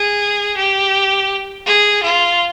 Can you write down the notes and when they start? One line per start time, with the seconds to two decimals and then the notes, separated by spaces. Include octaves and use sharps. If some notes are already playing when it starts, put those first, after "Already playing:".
Already playing: G#4
0.57 G4
1.66 G#4
2.02 F4